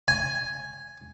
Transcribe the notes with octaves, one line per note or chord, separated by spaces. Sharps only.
G#5